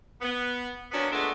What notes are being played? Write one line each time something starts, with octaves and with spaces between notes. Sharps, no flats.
B3
F#3 A#3 B3 C#4 D4
A#2 G#3 A3 B3 D4